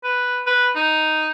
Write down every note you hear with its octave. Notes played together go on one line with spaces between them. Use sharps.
B4
B4
D#4